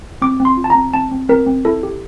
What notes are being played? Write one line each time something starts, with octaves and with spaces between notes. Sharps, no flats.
C4 D6
C4
C6
F4
A5
C4 A#5
C4 A5
C4
C4 A#4
C4
E4 A4
G4